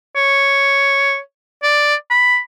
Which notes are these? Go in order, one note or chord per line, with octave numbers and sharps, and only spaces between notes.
C#5
D5
B5